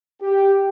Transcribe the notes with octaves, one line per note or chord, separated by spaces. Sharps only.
G4